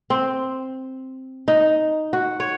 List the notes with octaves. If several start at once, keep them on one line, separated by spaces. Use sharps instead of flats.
C4
D#4
F#4
C#5